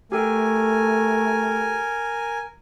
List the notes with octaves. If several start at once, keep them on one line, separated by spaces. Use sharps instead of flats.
A3 G4 A4 A#4 G5 G#5